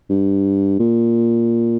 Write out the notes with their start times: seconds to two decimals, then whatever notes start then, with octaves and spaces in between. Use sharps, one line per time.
0.09 G2
0.79 A#2